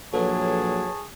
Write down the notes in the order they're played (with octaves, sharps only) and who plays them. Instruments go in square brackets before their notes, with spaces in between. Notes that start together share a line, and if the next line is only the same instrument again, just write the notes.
[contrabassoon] A#1 [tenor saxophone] F#3 [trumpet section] G#4 A5 C#6 [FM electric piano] A4 B4 C#5